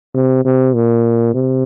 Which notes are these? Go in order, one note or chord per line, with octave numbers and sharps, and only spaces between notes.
C3
C3
A#2
C3